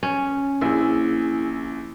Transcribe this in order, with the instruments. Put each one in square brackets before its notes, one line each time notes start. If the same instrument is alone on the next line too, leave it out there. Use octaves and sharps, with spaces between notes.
[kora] C#4
[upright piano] A#1 G#4 [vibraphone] E4